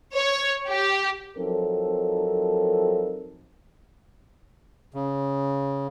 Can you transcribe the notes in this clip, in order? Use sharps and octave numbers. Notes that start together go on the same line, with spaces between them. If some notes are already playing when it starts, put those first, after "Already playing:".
C#5
G4
F3 F#3 C4 D#4 A4 A#4
C#3